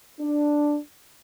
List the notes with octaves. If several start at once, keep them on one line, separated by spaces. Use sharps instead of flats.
D4